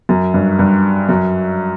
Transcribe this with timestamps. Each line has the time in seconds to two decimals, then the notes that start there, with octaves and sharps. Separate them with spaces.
0.09 F#2
0.34 G2
0.59 G2
1.09 F#2